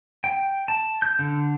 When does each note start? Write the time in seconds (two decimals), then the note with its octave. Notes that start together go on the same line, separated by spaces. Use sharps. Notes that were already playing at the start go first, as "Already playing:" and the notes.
0.24 G5
0.68 A5
1.02 G6
1.19 D3